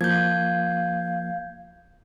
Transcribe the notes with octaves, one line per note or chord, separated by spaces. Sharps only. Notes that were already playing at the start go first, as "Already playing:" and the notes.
F3 A#3 F5 G6 G#6